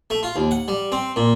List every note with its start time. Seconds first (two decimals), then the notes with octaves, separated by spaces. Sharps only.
0.10 A3
0.23 F4
0.36 D#2
0.51 F#5
0.68 G3
0.92 C4
1.16 A#2